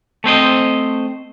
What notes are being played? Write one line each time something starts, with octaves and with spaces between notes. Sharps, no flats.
A3 C4 C5 D#5